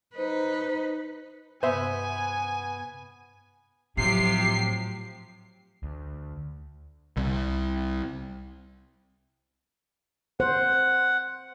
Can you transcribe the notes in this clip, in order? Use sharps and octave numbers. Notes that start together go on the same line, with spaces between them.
D#4 B4 C5
G2 C3 B3 C5 E5 G#5 C6
A2 C3 F3 F#3 G4 C7
D2
C2
C5 F#5